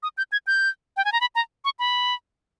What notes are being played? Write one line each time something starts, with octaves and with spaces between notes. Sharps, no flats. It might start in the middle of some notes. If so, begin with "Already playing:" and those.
D#6
G6
G#6
G6
G5
G#5
A#5
B5
A#5
C#6
B5